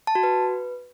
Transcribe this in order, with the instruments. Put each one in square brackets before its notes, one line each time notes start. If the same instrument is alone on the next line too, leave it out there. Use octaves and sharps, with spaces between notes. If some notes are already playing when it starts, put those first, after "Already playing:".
[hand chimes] A5
F#4
B4